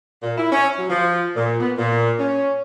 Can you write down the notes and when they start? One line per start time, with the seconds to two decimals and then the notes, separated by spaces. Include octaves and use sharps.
0.23 A#2
0.38 E4
0.52 C#4
0.78 F#3
0.90 F3
1.35 A#2
1.60 B3
1.78 A#2
2.18 C#4